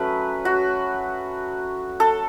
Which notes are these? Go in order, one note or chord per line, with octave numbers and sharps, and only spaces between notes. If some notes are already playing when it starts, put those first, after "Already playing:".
Already playing: F#3 A3 C#4 B4
F#4
A4